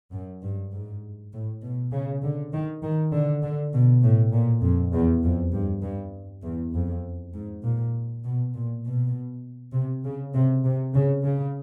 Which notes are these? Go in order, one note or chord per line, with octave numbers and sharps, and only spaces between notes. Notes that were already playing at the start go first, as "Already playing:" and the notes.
F#2
G2
G#2
A2
B2
C#3
D3
D#3
D#3
D3
D3
B2
A2
A#2
F2
E2
F2
G2
G2
E2
F2
G#2
A#2
B2
A#2
B2
C3
C#3
C3
C3
C#3
C#3